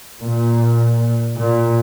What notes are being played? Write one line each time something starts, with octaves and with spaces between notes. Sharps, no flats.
A#2
A#2